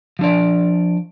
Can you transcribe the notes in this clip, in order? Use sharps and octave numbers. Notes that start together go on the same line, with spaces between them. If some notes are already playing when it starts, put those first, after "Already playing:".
F3 D4 D5